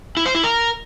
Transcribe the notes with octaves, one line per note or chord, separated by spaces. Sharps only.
E4
C5
E4
A#4